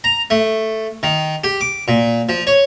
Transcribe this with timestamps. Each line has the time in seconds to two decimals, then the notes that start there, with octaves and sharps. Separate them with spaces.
0.04 A#5
0.30 A3
1.03 D#3
1.44 G4
1.61 D6
1.88 A#2
2.29 F3
2.47 C#5